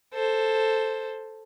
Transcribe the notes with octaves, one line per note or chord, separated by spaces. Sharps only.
A4 C5